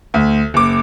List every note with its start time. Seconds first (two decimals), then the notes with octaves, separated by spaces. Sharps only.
0.14 D2
0.54 F#1 D6